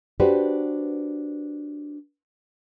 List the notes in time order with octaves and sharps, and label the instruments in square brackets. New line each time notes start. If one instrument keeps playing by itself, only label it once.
[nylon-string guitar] D4 F#4 G4 B4 C5 D5